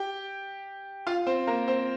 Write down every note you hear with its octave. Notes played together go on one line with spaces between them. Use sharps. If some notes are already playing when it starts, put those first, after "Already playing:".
Already playing: G4 G5
F4 F5
C4 C5
A#3 A#4
C4 C5